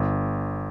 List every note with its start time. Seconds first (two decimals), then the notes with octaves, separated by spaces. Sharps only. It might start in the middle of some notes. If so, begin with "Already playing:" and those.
Already playing: G1